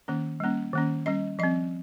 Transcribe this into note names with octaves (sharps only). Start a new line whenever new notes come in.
D#3 A#3 C#4
G3 A#3 C#4
D#3 A#3 C#4
G3 C#4 D#5
F3 C4 D#5